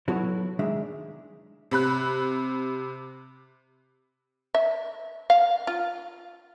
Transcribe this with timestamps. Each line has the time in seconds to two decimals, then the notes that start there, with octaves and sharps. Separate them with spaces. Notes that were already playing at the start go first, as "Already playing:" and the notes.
0.08 F#3 B3 E4 F#4 A4 C#5
0.59 D#3 G#3 D4 E5
1.71 C3 B5 F#6
4.55 E5
5.30 F5
5.67 F4